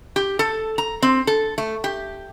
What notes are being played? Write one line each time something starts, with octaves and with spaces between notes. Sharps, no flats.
G4
A4
A#5
C4
A4
A3
G4